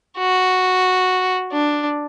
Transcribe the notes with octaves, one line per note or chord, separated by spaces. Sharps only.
F#4
D4